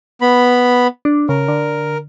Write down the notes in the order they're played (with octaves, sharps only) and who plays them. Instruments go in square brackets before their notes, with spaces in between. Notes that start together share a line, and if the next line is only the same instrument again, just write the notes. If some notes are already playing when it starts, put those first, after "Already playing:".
[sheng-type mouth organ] B3 B5
[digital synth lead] D4
[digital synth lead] C#3 [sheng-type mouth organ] A#4
[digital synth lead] D3